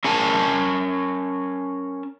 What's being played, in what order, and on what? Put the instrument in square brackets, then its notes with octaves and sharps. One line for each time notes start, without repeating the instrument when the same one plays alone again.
[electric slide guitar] C#4 A#4 G#5 A5